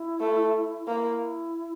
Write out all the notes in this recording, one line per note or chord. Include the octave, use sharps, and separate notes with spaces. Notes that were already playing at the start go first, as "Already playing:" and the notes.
Already playing: E4
A3
A#3 E4